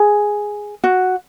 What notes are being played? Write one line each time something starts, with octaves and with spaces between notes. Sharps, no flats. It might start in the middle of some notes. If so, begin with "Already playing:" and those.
Already playing: G#4
F#4